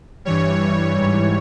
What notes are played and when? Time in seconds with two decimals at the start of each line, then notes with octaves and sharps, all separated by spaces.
0.25 G2 E3 G3 C#5
0.98 G#2 E3 G3